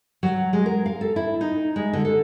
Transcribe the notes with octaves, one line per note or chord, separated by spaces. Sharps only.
F#3
G#3
A#4
F5
A4
E4
D#4
G#3
D3
A4